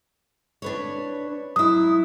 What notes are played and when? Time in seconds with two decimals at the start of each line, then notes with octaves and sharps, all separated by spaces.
0.62 D4 B4 C#5
1.56 F#3 E4 D#6